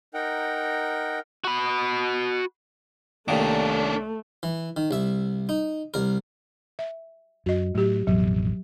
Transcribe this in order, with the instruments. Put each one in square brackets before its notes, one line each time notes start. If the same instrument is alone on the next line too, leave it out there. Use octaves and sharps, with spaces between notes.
[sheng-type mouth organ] D#4 A#4 F#5 G5
[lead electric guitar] F#4 B5
[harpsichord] C2 A#2 D#3 [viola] A3 [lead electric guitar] C#4 D4
[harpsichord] E3
D#3
C2 E5
D#4
C2 A#4
[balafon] E5
[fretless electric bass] F#2 [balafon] F#4 D#5
[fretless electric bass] A2 [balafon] F#3 G4
[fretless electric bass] A1 F2 B2 [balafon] F#3